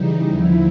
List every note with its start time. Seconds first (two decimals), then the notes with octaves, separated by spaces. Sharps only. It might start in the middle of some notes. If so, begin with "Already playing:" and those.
Already playing: C#3 E3 G3 D#4
0.28 D#2 D3 F3 E4